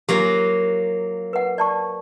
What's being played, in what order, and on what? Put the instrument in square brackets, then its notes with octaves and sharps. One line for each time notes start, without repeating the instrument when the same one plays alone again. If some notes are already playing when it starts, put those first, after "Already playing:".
[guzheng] F#3 A#3 F4 [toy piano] G4
[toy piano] B4 F#5
D5 A5 C#6